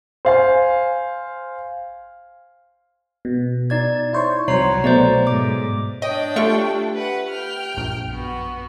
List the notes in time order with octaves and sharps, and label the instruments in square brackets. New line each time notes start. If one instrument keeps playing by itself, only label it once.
[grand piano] C5 F5 G#5
[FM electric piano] B2
[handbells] D#4 D5 G#6
[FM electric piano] E4 C5 C#5
[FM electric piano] C2 C5 [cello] F#3 [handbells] C#5 A#5 C7
[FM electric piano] B2 A3 [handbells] C5 D5 A#5
[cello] G#2 [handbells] D6
[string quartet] D4 G5 [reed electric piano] C#5 [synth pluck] D#5
[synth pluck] A3 F4 C#6 [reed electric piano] G4 E5
[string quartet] B4 F#5
G5 F6
[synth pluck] A#1 [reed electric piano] F#2
[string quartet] B3 F#4